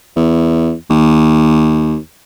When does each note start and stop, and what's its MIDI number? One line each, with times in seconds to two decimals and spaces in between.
0.16 0.73 40
0.90 1.96 39